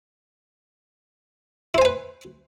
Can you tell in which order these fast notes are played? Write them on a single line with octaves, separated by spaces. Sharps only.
E4 C5 G#5 B4